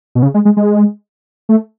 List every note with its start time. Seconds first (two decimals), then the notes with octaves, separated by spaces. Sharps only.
0.15 B2
0.22 C#3
0.34 G#3
0.45 G#3
0.57 G#3
1.49 A3